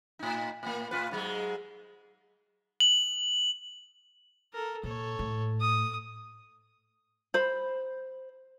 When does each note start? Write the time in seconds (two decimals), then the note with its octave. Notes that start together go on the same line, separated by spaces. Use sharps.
0.19 A2 D#4
0.63 A2 A#3
0.91 A2 F4 B4
1.11 G#2 F#3 G#3
2.80 F#7
4.53 A4 A#4
4.83 A#2 A4 C#5
5.19 A2
5.61 D#6
7.34 C5 B5